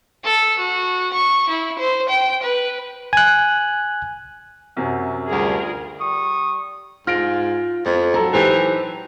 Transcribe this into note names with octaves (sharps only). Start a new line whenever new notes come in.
A4
F#4
C#6
E4
C5
G5
B4
G#5 F#6
F#2 C3 F#3
D2 G3 F4 G#4 A#4
G3 C#6 D#6
G#2 F4 F6 A#6 D7
F2 B3
F#3 D4 A4 A#5
E3 D#4 G4 C5